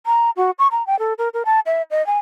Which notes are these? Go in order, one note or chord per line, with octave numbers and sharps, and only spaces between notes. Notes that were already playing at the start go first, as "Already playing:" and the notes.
A#5
F#4
C#6
A#5
G5
A4
A#4
A#4
A5
E5
D#5
G#5